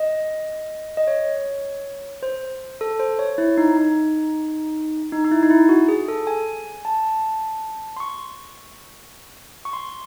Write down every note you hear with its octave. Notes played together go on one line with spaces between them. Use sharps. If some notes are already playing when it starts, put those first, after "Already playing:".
Already playing: D#5
D#5
C#5
C5
A4
C5
C#5
E4
D#4
D#4
D#4
D#4
E4
D#4
E4
F#4
G#4
A4
G#5
A5
C6
C#6
C#6
C6